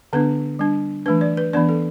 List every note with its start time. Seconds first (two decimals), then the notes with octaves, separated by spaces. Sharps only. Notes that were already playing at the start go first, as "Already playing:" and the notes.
0.13 D3 B3 D4 B4
0.59 G3 D4
1.06 E3 A3 D4 B4
1.21 D5
1.37 B4
1.53 E3 B3 D4 D5
1.69 A4